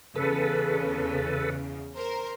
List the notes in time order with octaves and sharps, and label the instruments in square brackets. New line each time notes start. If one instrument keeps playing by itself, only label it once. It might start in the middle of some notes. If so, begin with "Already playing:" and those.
[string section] E2 C#3 [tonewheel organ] A4 B4
[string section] A#4 C5